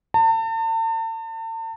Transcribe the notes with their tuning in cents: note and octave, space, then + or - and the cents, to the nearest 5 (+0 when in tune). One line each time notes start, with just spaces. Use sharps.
A5 +40